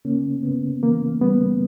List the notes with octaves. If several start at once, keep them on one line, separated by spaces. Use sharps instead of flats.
C#3 A#3 C#4
C#3 B3
E3 A#3
G3 B3